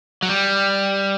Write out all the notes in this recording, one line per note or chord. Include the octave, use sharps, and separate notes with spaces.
F#3
G3